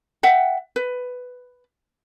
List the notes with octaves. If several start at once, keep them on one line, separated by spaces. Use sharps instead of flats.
E5 F#5 G5
B4